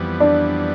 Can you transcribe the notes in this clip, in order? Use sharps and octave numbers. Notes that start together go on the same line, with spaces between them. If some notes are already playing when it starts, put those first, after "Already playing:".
Already playing: F2 E3 G3 B3
D4